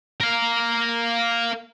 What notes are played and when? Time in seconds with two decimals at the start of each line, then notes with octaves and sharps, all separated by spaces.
0.20 A#4 F5